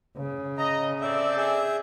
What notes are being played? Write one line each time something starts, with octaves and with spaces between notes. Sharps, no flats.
C#3
D#5 A#5
C4 A4 D5 E5
G#4 E5